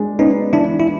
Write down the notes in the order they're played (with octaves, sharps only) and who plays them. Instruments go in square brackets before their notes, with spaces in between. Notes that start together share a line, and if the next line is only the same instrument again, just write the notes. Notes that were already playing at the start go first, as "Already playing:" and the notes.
Already playing: [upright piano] G#3 D4
[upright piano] B3 [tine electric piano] C#4 D#4
[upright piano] E3 [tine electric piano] D4 E4
[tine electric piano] E4